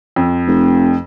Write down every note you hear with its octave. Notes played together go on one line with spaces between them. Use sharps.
F2
F1